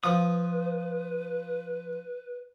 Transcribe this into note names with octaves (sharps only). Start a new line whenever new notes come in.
F3 B4 D#6